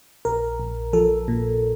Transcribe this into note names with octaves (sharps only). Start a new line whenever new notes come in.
A#1 A#4
A#1
F3 A4
A#2